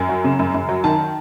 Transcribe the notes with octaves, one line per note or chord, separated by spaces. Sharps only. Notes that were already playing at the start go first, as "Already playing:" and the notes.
Already playing: F#2 G#5
F#3
C#3
F#2
F#2
F#3
D#3 A5